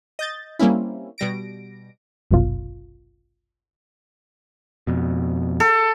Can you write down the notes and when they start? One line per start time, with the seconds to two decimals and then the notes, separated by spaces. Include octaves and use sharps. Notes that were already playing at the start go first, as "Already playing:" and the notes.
0.19 D#5 G6 A6
0.59 G3 A#3 C4 C#4 E4
1.18 B2 G3 A#6 D7
2.31 G1 C2 F#2 B2 F4
4.87 F2 B2
5.60 A4